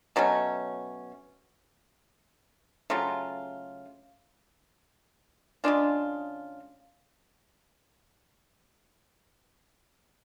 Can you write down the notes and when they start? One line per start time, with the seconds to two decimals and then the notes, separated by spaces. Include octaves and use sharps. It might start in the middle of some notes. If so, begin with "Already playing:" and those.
0.16 B2 F#3 A3 C#4
2.90 C#3 F#3 A3 F4
5.64 C#3 G#3 D4 F4